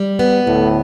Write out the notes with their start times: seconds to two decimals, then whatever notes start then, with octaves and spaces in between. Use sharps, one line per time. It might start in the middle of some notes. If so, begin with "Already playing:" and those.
Already playing: G3
0.19 B3
0.47 D2 A2